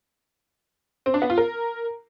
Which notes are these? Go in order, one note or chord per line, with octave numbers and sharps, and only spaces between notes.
C4
D4
B3
F4
A#4